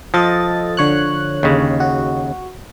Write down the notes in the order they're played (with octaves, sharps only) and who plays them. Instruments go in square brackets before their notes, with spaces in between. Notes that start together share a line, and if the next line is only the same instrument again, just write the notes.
[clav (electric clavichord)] F3 [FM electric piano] A4 D#5 A6
[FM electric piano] D3 C#5 F#6
[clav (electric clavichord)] D#2 C#3
[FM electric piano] F#4